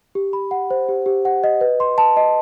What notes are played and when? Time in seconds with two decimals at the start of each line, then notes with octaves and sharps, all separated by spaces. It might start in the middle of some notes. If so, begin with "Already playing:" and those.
0.15 G4
0.33 B5
0.51 F#5
0.70 C5
0.89 G4
1.06 G4
1.25 F#5
1.44 D#5
1.61 B4
1.80 C6
1.98 A5
2.17 D#5